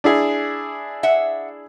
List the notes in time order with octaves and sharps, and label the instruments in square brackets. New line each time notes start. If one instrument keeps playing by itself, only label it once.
[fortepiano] D4 E4 G#4
[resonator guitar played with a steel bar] E5 F#5